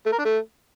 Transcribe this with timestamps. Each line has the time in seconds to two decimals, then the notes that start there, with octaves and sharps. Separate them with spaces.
0.06 A3
0.12 A#4
0.19 D4
0.25 A3